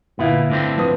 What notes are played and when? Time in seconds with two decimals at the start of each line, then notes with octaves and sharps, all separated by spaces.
0.19 G1 A#2 B3 E4 F5
0.50 A2 D3 C4
0.78 F3 B4 D#6